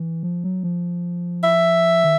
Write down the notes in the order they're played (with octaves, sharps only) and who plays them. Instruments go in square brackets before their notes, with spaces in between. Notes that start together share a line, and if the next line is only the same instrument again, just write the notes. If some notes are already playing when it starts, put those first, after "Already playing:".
Already playing: [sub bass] E3
F3
F#3
F3
[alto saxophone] E5
[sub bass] D#3